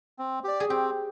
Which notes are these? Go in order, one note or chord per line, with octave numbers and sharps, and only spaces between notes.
C4
G4 D5
G#4
C4 G4